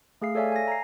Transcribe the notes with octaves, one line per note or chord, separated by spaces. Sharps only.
A3 G#4 F5 C7
A4 C#5 D5 E5 F5 G#5
G#5 A#6
A#5 C7